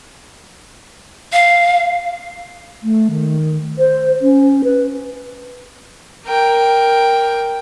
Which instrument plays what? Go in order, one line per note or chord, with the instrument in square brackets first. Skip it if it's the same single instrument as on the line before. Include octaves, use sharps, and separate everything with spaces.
[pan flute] F5
[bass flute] A3
D#3
C5
C#4
B4
[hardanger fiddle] A#4 G5